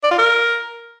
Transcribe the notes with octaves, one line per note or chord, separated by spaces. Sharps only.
D5
F4
A#4